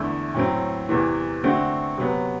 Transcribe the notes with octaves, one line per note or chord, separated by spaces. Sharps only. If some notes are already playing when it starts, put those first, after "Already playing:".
Already playing: E2 D3 A3 E4
A2 F#3 C4
E2 C3 E3
D3 A3 C4 F#4
C3 F#3 B3